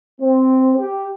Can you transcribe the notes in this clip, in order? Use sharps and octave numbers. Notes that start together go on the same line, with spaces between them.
C4
G4